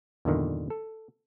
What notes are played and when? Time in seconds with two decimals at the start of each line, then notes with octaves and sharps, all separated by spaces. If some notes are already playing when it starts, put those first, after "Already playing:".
0.25 E2 G2 A#2 D3 D#3
0.70 A4